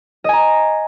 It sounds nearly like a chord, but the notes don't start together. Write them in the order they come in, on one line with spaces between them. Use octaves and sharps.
D#5 G#5 A#5